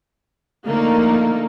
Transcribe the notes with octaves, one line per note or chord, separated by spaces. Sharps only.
D3 F3 A3 A#3 D#4